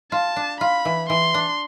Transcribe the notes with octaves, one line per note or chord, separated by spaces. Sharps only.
F4 A5
D4
F4 B5
E3
E3 C6
D4